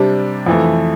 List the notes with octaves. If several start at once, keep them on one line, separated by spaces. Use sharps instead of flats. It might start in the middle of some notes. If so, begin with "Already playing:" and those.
Already playing: C3 G3 D4
F2 E3 A3